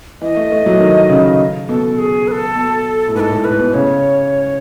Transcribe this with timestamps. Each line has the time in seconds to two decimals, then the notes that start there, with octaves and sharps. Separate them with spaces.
0.21 E3 D#5
0.36 A3
0.52 A3
0.66 F#3
0.80 D#3
1.09 C#3
1.68 B2 A4
1.98 G#4
2.28 B4
2.31 A4
2.56 B2
3.08 A2
3.15 G#2 B4
3.20 A4
3.29 A2
3.44 A2 B4
3.59 B2
3.74 C#3 C#5